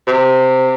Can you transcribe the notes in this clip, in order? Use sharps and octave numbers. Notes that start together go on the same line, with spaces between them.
C3